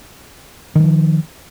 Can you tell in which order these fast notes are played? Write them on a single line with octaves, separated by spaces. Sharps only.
D#3 F#3 F3